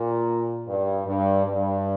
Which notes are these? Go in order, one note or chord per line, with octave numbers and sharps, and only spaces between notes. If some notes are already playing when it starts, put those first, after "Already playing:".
Already playing: A#2
G2
G2
G2